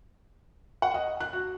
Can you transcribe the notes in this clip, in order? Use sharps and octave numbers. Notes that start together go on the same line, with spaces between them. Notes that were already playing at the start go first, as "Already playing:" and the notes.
F#5
D#5
F#6
F#4